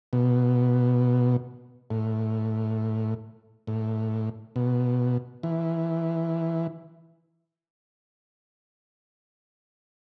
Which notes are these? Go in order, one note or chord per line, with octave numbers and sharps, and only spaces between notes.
B2
A2
A2
B2
E3